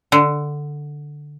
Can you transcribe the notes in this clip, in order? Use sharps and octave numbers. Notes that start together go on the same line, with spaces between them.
D3